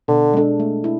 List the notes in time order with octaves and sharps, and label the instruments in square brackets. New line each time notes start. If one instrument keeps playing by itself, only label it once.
[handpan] B2 [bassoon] D3
[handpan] G#3 D4 A4
A3
E4